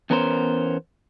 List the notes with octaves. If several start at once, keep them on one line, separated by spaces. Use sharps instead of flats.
E2 B3 C#4 A#4 C5